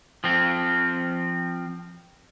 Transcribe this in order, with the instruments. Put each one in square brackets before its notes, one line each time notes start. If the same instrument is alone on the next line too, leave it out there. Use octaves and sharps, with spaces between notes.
[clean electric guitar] F3 C4